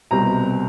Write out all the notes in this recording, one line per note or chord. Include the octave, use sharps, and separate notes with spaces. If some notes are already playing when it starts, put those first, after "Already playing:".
C2 B2 G3 C4 A#5